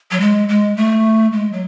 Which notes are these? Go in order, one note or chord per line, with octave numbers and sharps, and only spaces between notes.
F#3
G#3
G#3
A3
G#3
F#3